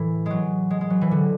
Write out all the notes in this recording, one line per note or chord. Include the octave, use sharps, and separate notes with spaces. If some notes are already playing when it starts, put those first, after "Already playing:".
Already playing: A2 E3
F#3 G#3
G#3
G#3
F#3
E3
D3